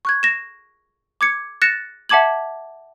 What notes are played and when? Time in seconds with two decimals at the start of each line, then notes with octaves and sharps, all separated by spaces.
0.05 C#6 F#6 G#6
0.23 A#6 E7
1.21 D6 G#6 C#7
1.62 F#6 A6 A#6 C#7 E7
2.09 E5 F#5 A5 D6 G#6 F#7